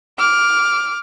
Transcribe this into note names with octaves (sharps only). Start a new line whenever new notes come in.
D6 F6